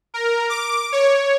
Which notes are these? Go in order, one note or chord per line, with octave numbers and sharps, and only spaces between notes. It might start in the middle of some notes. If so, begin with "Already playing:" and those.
A#4
D6
C#5